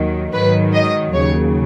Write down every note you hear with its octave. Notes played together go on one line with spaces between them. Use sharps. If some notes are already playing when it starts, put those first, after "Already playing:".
Already playing: D#2 D#3 F#3
G#2 D#3 F#3 B4
D#5
D#2 C#3 F#3 C#5